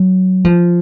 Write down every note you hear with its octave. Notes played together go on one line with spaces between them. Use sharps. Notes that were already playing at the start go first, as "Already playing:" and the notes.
Already playing: F#3
F3